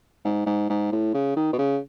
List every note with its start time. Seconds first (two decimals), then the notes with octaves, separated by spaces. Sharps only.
0.25 G#2
0.46 G#2
0.69 G#2
0.92 A2
1.14 C#3
1.36 D#3
1.53 B2
1.59 C#3